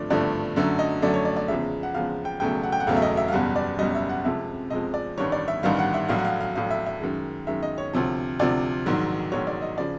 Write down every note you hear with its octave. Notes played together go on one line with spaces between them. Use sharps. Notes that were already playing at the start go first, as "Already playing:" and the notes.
Already playing: G#1 G2 D3 F3 A3 D5
G#1 G2 D3 F3 A3 D5
F#2 D3 F#3 A3
D#5
F#2 D3 F#3 A3 D5
C#5
D5
D5
E2 C#3 F3 G#3 E5
F#5
E2 C#3 F3 G#3 F5
G5
E1 E2 C#3 F#3 A3 G5
F#5
G5
F#5
E1 E2 C#3 F#3 A3 F5
E5
D#5
E5
F5
F#1 E2 B2 G3 F#5
D5
F#1 E2 B2 G3 D#5
E5
F#5
F2 C3 F3 G#3 E5
F2 C3 F3 G#3 D#5
D5
A1 G2 D#3 G3 C#5
D5
E5
A1 G2 D#3 G3 F5
F#5
E5
A#1 A2 F#3 F5
F#5
F5
F5
A#1 A2 F#3 F5
E5
E5
F#2 D#3 G#3
F#2 D#3 G#3 E5
D#5
C#5
D2 C3 F3
D2 C3 F3 D5
A#1 G#2 D#3 F#3
A#1 G#2 D#3 F#3 C#5
D5
D#5
C#3 F3 D5